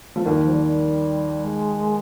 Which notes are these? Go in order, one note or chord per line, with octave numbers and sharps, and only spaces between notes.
F3
D#2 D#3 G3
F3
G3
G3
G#3